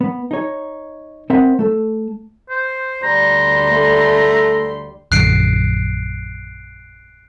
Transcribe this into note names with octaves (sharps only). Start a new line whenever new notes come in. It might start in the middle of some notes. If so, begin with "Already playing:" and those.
B3
D#4 C#5
C4 A#4 E5 F#5
A3 A4
C5
D2 G3 A#5 C6
A3
A#1 F#2 D3 F#6 C7 D7